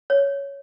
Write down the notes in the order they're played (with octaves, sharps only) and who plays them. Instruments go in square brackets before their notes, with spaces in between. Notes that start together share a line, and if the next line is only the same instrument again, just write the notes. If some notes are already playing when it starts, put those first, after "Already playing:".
[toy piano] C#5